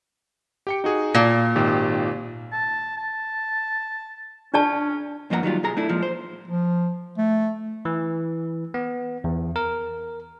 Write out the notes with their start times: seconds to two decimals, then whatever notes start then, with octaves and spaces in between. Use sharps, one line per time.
0.67 G4 G5 C#7
0.84 D#4 F#4 G#4
1.15 A#2 A5
1.56 G#1 D#3 G4
2.52 A5
2.97 A5
4.54 C#4 D4 D5 A5
5.30 G2 F3 A#3 D#5 F#5 A#5
5.43 D#3 F#3 G3 F4
5.63 B1 G#4 A#5
5.77 A3 D4 E4
5.89 A#2 F3 G#3
6.03 C5
6.48 F3
7.18 A3
7.85 E3
8.74 B3
9.24 E2
9.56 A#4